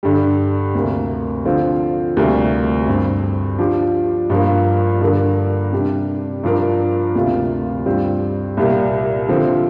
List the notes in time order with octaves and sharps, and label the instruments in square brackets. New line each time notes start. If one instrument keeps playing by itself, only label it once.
[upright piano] G2 D3 G3
D2 C3 A#3
D3 F3 C4 F4
D2 C3 G3 A#3
G2 G3 C4
F3 D4 G4
G2 F3 A#3
G2 D3 A#3 D4 A#4
C3 G3 D4
G2 F3 D4 A#4
D2 C3 A#3 F4
G2 G3 C4 F4 C5
C2 A#2 G3 A#3
D3 F3 C4